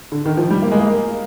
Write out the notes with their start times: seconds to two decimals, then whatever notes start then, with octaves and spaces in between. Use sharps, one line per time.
0.12 D3
0.25 D#3
0.37 F3
0.50 G3
0.62 A#3
0.71 G#3
0.80 A#3